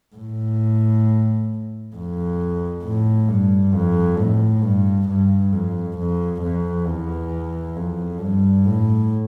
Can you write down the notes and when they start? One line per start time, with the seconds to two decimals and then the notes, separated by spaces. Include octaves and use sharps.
0.16 A2
1.95 F2
2.84 A2
3.29 G2
3.74 F2
4.18 A2
4.63 G2
5.08 G2
5.52 F2
5.98 F2
6.42 F2
6.86 E2
7.76 F2
8.21 G2
8.66 A2